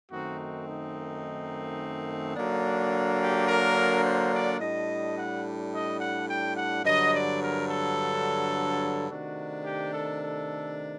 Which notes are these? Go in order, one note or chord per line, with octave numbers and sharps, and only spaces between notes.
F#2 D#3 A3 C4 D#4 F#4
F#4
D#4
D3 F#3 A#3 D4
G4
A#4
C5
D5
A2 G3 D4 D#5
F#5
D#5
F#5
G5
F#5
G2 D3 F#3 D#5
D5
A#4
A4
C3 D#3 A3 D4 F#4
G4
A4
A4